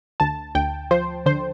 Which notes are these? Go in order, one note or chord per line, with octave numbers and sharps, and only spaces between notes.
D2 A5
D2 G5
F3 C5
D3 C5